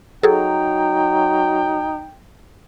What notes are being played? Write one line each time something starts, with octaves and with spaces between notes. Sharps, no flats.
F#3 D#4 G#4 A4 G5